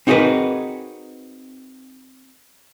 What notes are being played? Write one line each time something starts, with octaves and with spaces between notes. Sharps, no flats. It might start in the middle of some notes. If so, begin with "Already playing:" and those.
C4 D#4 F#4 G#4 A#4 B4